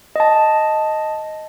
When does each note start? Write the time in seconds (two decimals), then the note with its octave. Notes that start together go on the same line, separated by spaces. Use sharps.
0.16 D#5 A5